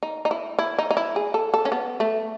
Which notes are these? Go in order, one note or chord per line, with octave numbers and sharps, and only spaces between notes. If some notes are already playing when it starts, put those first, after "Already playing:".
D#4
D#4
E4
E4
D#4
D#4
E4
G#4
A4
A4
C#4
B3
A3